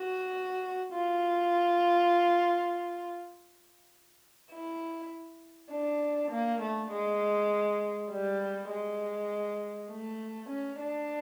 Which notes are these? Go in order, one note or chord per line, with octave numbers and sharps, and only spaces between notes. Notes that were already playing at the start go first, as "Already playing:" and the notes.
Already playing: F#4
F4
E4
D4
A#3
A3
G#3
G3
G#3
A3
C#4
D4